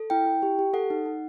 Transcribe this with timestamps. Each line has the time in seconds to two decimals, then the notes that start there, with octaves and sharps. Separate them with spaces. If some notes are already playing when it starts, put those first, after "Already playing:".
Already playing: A4
0.10 E4 G5
0.26 E4
0.42 G4
0.59 G4
0.73 A4 F#5
0.90 D#4
1.06 D#4